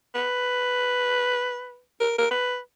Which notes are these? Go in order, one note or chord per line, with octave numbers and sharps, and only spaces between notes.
B4
A#4
A#4
B4